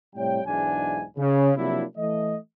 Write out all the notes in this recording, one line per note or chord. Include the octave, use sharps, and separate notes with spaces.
A2 C3 G3 C#5 G5
B1 E2 G#2 G#3 D4 G#5
C#3
C3 F3 F#3 A#3 D4 E4
E3 A3 D#5